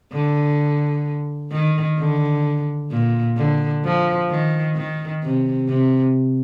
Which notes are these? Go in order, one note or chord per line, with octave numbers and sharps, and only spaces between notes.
D3
D#3
D3
A#2
D3
F3
D#3
D#3
C3
C3